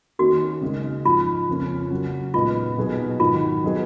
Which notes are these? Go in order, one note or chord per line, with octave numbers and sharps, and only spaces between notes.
D#3 A#3 C#4 F#4
C#3 G#3 D#4
G#2 F3 G#3 F4
F2 C#3 F3 A#3 C#4
C#3 F#3 C#4 F#4
A#2 G#3 B3 D#4 F4 F#4
B2 F#3 B3 D#4 G#4
G#2 D#3 F#3 F4
F#3 B3 D#4 G#4